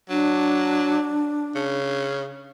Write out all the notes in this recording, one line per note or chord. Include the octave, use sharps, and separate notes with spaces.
F#3 D4
C#3